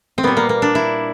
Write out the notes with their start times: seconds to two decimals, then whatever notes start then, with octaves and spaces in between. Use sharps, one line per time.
0.18 C4
0.23 A#2 G3 B3
0.37 A#3
0.49 A#3
0.62 D4
0.75 E4